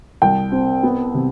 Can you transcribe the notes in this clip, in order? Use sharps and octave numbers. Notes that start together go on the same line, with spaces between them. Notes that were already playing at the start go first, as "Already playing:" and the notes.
C2 G5
C4
B3
C3